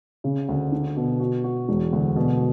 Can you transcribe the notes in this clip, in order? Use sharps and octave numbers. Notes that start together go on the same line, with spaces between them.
C#3
D2
D4
B2
F#4
F#4
E1
D2
B2